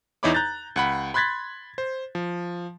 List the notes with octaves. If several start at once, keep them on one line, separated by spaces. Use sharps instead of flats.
E2 D#4 E4 C#5 B5 D6
A#5 F#6 G6 A6
C#2 F#5 B5
B5 C6 F#6 G#6 A6 B6
C5
F3